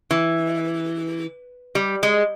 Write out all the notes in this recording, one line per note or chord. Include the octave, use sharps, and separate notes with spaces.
E3
G3
G#3